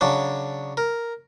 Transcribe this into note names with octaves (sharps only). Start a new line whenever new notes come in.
C#3 F#3 D4
A#4